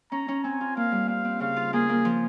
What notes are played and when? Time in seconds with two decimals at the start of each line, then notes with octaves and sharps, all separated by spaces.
0.12 C#4 A#5
0.28 C#4
0.44 C4 G#5
0.61 F4
0.76 A#3 F5
0.92 G3
1.08 C4 F5
1.25 C4
1.40 C#3 F5
1.56 F4
1.73 A#3 G#4
1.89 A#3
2.05 F3